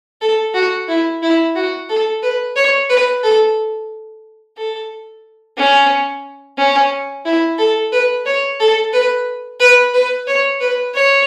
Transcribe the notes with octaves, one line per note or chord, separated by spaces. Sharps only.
A4
F#4
E4
E4
F#4
A4
B4
C#5
B4
A4
A4
C#4
C#4
E4
A4
B4
C#5
A4
B4
B4
B4
C#5
B4
C#5